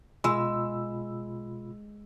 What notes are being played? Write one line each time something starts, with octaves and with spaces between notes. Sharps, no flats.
B2 G#3 F4 B5 E6